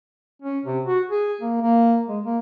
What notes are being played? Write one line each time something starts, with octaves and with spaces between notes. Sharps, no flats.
C#4
C3
F#4
G#4
A#3
A#3
G#3
A#3